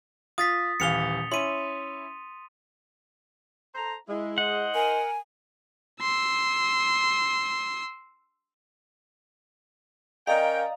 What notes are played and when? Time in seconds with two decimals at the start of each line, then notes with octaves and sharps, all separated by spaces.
0.38 F4 D#6 A6 B6
0.80 D#1 E3 F5 C#7 F7 G7
1.32 C#4 E4 C6 D#7
3.75 A4 C5 A#5
4.08 G#3 E4
4.38 E4 C5 D#5 F#5
4.75 A#4 G#5
6.02 C6 E6
10.27 C#4 A#4 D5 D#5 F5 G5 A#5